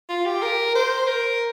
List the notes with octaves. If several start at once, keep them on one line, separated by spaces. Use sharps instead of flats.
F4
G4
A#4
C5
A#4